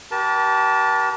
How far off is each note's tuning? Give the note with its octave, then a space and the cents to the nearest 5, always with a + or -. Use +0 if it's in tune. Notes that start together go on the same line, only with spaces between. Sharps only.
G4 -35 A#4 +40 A5 +0